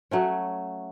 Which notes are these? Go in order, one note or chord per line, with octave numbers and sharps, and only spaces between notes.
F#3 A3 C#4